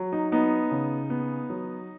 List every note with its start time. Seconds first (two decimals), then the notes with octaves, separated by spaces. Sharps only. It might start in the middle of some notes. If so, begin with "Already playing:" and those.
Already playing: F#3
0.12 D#4
0.32 B3 D#4
0.71 C#3
1.10 B3
1.50 F#3